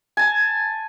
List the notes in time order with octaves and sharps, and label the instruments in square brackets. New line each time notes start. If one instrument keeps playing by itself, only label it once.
[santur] G#5 A5